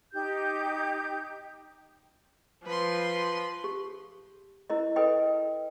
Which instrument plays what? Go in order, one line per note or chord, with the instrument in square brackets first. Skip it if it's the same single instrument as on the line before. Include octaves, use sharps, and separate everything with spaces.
[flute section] D#4 G4 G6
[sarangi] F3 [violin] B4 C6
[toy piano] G4
E4 A#4 D#5
A4 B4 D#5 G5